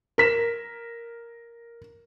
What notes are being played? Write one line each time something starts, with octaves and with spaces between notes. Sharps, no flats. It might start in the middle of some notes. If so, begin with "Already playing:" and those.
A#4 B6 E7